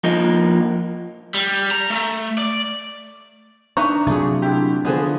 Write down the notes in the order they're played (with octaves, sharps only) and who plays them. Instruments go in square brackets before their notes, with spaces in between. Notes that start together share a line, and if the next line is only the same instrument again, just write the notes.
[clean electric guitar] F3 A#3 D#4
[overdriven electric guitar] G3
A#5
A3
D5
[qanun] D4 [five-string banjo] D#4 B4 A#5 [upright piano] E5 C#6
[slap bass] C3 F#3 [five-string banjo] A3 G#4 [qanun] F4
[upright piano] D3 E4 G4
[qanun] D3 F3 [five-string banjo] B3 G#4 A4 [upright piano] B4